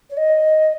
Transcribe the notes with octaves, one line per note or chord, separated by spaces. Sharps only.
C#5
D#5